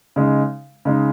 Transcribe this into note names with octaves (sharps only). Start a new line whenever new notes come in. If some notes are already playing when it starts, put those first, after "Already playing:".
C#3 G#3 D#4
C#3 G#3 D#4